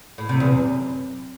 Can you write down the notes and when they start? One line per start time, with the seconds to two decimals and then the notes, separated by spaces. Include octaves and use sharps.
0.18 A2
0.29 C3
0.40 E2
0.51 F#2